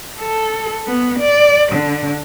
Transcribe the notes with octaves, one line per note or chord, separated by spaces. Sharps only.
A4
B3
D5
D3